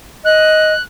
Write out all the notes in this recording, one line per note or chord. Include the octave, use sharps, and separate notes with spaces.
D#5 F#6